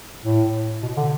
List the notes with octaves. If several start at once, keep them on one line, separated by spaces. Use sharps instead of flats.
A2
B2
D3